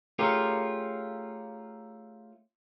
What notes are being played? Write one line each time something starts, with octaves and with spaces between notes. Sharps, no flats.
A3 C#4 F4 G4 G#4 A#4